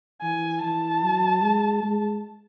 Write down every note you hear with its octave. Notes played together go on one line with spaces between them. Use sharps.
E3 G#5
E3 A5
F#3
G#3
G#3